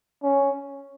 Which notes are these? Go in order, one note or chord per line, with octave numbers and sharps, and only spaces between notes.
C#4